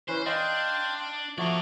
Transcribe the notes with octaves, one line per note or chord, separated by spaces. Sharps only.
E3 C#4 B4 C5
D4 D#5 F5 G5 C6
F3 A3 F#4 D5 A#5